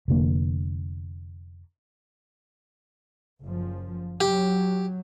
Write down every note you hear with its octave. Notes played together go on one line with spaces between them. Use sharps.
F1 D3 A#3
F#1 F3
F#3 G4